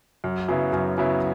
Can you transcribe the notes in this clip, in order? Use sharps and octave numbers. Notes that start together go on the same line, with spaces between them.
F#2
C#3 F#3 B3 E4
F#2
C#3 F#3 B3 E4